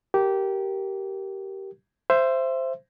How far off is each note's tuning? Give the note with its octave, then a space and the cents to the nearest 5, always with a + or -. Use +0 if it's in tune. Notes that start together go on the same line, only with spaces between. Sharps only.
G4 -15 A#4 +0
C5 +0 E5 +25